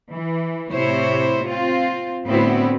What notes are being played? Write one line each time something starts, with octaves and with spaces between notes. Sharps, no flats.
E3
A2 C3 E4 C5 C#5
C4 F4
A2 D3 B3 C4 E4 F#4